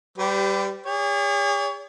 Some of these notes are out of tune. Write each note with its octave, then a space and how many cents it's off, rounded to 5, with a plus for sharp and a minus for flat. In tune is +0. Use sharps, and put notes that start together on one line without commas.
G3 +0 G4 -15 B4 +40
G#4 -40 C#5 +35